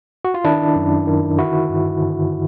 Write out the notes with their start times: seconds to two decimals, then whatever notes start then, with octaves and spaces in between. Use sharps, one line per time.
0.25 F#4
0.34 F4
0.44 D#3 D4 E4
0.76 F#2
1.07 D#3
1.38 D3 E4 F#4
1.70 G2
2.01 D3